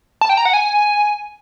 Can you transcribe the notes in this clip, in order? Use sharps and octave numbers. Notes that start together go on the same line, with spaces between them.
A5
G5
A#5
F#5
G#5